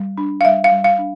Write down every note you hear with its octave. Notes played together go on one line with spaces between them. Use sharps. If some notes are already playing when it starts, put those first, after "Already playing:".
Already playing: G3
D4
F5
G3 E5
F5
G3
F5
D4